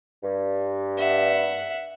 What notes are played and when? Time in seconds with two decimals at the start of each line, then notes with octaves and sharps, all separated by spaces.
0.23 G2
0.97 E5 F#5